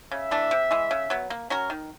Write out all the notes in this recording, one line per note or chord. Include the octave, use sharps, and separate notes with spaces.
C#3 E5
E3 A3 D4
C3
E3 G#3
C#3
F#3 B3
A#3
C#4 F#4 A#4
D#3